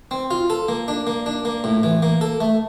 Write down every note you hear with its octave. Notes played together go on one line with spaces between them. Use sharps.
C4
F4
A4
A#3
D4
A#3
D4
A#3
A2
E3
A#3
A4
A3